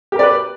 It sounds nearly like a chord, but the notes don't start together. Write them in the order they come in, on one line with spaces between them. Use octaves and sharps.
G4 A#4 D5 B4